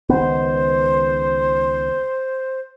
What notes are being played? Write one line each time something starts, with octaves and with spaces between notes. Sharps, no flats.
C#2 D#3 B3 C5